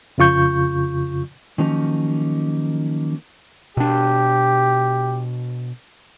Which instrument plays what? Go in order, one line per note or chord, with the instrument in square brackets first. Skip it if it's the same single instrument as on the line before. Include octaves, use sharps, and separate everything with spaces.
[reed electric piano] F2 C#3 F4 C#6 G6
[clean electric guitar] D#3 F3 F#3 A#3 C#4 D#4
[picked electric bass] B2 D4 [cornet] G4